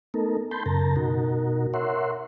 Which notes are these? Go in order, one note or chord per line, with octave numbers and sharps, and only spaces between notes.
A3 B3 D#4 A4 A#4
A5 B5 C6 G6
F#2 C#3 A#4 A5 A#5
B2 D#4 F#4 A#4
A#4 C#5 E5 F#5 C6